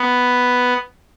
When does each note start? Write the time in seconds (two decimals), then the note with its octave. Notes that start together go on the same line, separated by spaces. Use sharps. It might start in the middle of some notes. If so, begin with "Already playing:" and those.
Already playing: B3